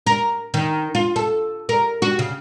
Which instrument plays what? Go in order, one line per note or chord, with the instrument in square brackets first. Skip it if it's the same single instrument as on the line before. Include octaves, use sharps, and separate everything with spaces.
[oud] A#4
D#3
F4
A4
A#4
F#4
C#3